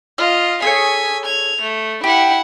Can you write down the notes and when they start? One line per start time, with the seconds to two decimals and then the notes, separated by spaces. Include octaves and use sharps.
0.18 F4 D#5 F6
0.62 G#4 A4 C#5 G#5 B6
1.26 G#6 F7
1.62 A3
2.04 E4 G4 F#5